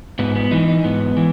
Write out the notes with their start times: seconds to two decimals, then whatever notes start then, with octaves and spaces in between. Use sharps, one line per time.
0.19 G#2 B3
0.35 B3
0.51 E3 D#4
0.68 D#4
0.84 G#2 B3
1.17 E3